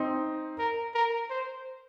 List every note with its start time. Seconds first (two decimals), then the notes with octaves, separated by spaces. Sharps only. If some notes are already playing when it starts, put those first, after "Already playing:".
Already playing: C4 D#4
0.59 A#4
0.95 A#4
1.30 C5